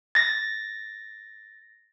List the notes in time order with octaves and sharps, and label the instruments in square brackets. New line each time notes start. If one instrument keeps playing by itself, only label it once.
[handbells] A6 A#6